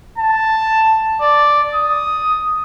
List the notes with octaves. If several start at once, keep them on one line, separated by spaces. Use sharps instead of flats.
A5
D5
D#6